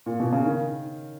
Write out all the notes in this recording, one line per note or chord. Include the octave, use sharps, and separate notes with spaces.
A#2
B2
C#3
D#3